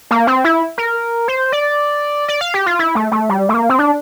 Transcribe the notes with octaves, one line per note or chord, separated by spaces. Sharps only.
A#3
C4
E4
A#4
C5
D5
D5
F5
G4
F4
E4
A3
A3
G3
A3
A#3
C4
D4